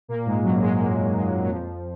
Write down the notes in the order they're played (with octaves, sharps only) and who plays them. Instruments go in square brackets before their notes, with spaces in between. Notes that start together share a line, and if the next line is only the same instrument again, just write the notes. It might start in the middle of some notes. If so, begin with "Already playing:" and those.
[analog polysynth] A#2 A#3
G#2 G#3
F#2 F#3
G#2 G#3
A#2 A#3
G#2 G#3
F#3
F2 F3